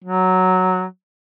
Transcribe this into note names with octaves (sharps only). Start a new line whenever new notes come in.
F#3